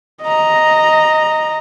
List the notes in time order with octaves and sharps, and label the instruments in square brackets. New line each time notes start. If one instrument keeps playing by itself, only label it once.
[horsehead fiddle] D#5 A#5